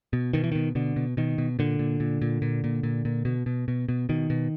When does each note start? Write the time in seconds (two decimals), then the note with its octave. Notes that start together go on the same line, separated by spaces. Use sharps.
0.13 B2
0.33 B2 D#3
0.44 E3
0.52 B2 D#3
0.75 B2 D3
0.96 B2
1.17 B2 D#3
1.38 B2
1.59 A#2 D3
1.79 A#2
2.00 A#2
2.22 A#2
2.42 A#2
2.64 A#2
2.83 A#2
3.05 A#2
3.25 B2
3.46 B2
3.68 B2
3.88 B2
4.09 B2 D#3
4.30 B2